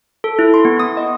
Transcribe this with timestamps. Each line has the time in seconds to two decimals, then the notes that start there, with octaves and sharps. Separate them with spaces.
0.24 A4
0.39 E4
0.54 C6
0.65 B3
0.80 D#6
0.97 D#5